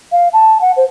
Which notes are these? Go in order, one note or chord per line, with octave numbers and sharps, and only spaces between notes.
F5
A5
F#5
C5